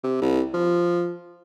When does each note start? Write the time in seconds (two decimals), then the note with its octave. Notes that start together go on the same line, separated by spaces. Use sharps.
0.03 C3
0.21 C2
0.54 F3